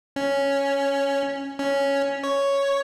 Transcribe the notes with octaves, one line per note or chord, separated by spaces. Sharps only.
C#4
C#4
C#5